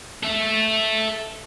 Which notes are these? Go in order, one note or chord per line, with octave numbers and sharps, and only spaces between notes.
A4 E5